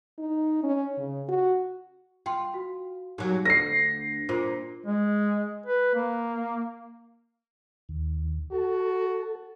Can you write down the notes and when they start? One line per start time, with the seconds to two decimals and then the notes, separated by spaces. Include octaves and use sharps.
0.19 D#4
0.63 C#4
0.98 C#3
1.29 F#4
2.26 F4 G5 C6
2.54 F#4
3.18 A#2 F#3 D#4 G4
3.45 D2 A4 A#6 C7
4.29 A#2 F4 A#4 C5
4.86 G#3
5.66 B4
5.95 A#3
7.89 D#2
8.52 F#4 A4